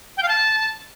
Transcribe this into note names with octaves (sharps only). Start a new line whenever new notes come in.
G5
F5
A5